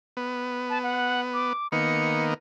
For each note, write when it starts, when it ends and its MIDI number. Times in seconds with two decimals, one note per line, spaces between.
0.17 1.53 59
0.70 0.79 81
0.83 1.21 78
1.34 1.67 86
1.72 2.34 51
1.72 2.34 58
1.72 2.34 59
1.72 2.24 97